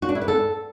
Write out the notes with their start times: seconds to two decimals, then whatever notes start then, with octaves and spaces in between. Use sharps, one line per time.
0.02 F#4
0.09 D4
0.15 E4
0.22 B4
0.28 A4